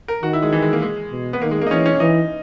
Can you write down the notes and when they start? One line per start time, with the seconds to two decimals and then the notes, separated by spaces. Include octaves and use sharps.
0.08 A#4
0.23 D#3 F#4
0.33 E4
0.42 G#3
0.53 E3
0.62 G#3
0.73 A#3
0.82 G#3
1.11 B2
1.33 B3
1.41 D#3 A#3
1.51 G#3
1.61 A#3
1.67 D#4
1.71 E3 C#4
1.86 C#4
2.00 E3 D#4